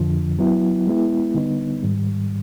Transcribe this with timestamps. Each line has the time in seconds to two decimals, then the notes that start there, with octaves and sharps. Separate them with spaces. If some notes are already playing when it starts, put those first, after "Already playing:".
Already playing: F2 D3 F3
0.39 F#3 B3 E4
0.87 G#3 B3 E4
1.34 D3 G3 B3 D#4
1.83 G#2 D#3 G3